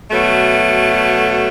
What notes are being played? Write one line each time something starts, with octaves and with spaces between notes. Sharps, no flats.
B2 F#3 A3